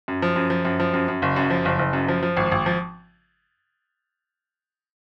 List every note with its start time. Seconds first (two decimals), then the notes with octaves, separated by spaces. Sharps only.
0.08 F#2
0.22 F3
0.36 F#2
0.50 F3
0.65 F#2
0.80 F3
0.94 F#2
1.08 F#2
1.22 F#1
1.36 F#2
1.50 F3
1.65 F#1
1.79 F#1
1.93 F#2
2.08 F3
2.23 F3
2.37 G#1
2.52 G#1
2.66 F3